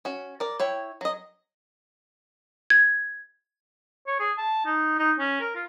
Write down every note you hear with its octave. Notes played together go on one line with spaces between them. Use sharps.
C#4 F#4
A#4 D5
E4 C#5 G5
F#3 D#5
G#6
C#5
G#4
A5
D#4
D#4
C#4
A#4
F4